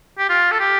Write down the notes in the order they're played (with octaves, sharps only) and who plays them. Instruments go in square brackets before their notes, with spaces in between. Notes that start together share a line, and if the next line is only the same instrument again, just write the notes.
[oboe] G4
F4
A4
G4